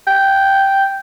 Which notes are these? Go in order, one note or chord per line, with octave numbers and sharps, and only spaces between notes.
G5